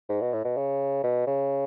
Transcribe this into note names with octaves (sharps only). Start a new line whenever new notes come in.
G#2
B2
A2
B2
C#3
B2
C#3